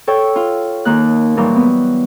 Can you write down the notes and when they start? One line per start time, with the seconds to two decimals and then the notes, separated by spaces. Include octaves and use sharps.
0.07 A4 C#5 G5
0.36 F4
0.85 D#2 D#3 A#3 F#6
1.37 A#2 E3 F#3 G3 A#3
1.56 B3